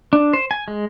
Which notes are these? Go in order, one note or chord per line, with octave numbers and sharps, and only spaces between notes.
D4
C5
G#5
G#3